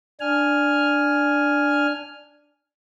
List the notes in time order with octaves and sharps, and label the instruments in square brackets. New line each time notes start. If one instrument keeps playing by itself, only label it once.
[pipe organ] D4 G#5 F6